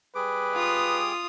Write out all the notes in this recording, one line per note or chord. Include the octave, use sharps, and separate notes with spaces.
G3 G#4 B4 D6
F4 D#6